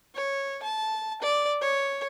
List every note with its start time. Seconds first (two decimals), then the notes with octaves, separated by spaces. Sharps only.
0.15 C#5
0.63 A5
1.22 D5
1.61 C#5